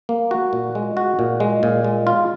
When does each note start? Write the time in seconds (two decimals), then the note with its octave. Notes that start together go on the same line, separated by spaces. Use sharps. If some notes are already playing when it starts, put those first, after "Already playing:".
0.09 A#3
0.31 F#4
0.53 A#2
0.75 G#3
0.97 F#4
1.19 A#2
1.40 G#3
1.63 A#2
1.84 G#3
2.07 F4